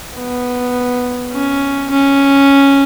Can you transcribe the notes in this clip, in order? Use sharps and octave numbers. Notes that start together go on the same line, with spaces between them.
B3
C#4
C#4